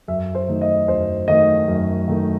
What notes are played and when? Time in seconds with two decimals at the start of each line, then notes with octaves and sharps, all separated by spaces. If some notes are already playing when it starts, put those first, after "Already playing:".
0.08 F#2 E5
0.35 C5
0.48 D#3 A3 D#4
0.61 D#5
0.88 F#2 C5
1.28 D#3 A3 D#4 D#5
1.68 F#2
2.08 D#3 A3 D#4